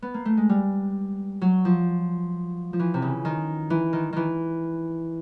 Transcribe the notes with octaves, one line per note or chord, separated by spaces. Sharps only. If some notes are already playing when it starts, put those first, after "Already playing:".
B3
A#3
A3
G#3
G3
F#3
F3
F3
E3
C3
C#3
D#3
E3
D#3
D#3 E3